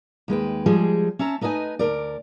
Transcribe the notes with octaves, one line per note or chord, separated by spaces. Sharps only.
D#2 G#3 B4 G5
F3 G3 G#3 G#4
C#4 E5 A5 A#5
A3 D#4 B4 D#5 G#5
D2 C3 A#4 D5